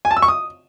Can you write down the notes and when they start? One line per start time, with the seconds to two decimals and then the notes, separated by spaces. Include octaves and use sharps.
0.05 G#5
0.11 A5
0.17 E6
0.22 C#6
0.28 D#6